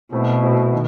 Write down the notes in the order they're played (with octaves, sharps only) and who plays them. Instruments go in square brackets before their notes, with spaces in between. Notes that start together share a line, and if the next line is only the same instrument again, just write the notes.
[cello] B2 [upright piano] F#3 A3 C4 E4
[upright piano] F#3 A3 C4 E4
D#3